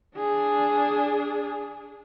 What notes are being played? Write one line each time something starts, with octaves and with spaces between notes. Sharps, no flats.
D4 G#4